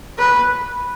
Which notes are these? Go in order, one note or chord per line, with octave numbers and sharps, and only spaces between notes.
B4